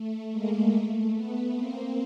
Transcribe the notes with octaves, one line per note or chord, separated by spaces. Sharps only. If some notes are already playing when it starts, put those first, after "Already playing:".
Already playing: A3
G#3 A#3
A3
A3 B3
A#3 C4